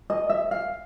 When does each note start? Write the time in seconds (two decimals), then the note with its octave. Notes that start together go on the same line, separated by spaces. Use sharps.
0.10 D#5
0.30 E5
0.51 F5